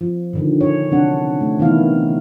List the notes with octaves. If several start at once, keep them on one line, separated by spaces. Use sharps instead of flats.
F3
A#2 D3 D#3
C#5
C3 F#3 C#4 D4 F#5
A3
C3 D#3 E3 B3 E4 F5